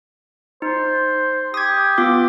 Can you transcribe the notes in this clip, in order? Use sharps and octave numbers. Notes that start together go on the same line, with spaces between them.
D#4 C5
G4 D#6 G#6
B3 F4 D6